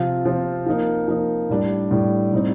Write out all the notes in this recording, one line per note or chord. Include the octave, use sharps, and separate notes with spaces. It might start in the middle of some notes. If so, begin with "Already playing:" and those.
Already playing: C3 F3 C4 F4
C3 F3 C4 F4
F3 A#3 D#4
F3 A#3 D#4
A2 G3 D4
A2 G3 D4
A2 G3 C4 D#4